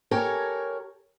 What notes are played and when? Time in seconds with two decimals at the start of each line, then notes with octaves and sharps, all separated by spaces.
0.11 G4 A4 A#4 C#5 G#5